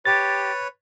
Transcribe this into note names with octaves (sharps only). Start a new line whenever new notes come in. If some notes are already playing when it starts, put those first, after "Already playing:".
G4 B4 C#5 A6